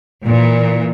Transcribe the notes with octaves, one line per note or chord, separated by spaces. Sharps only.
A#2 E3